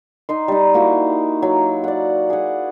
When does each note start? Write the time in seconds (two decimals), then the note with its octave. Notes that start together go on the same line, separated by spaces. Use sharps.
0.29 D#4 D#5 C6
0.48 G3 D#4
0.74 A#3 D#4 E4 F#4
1.42 F#3
1.84 D5 F#5
2.30 G#4 F#5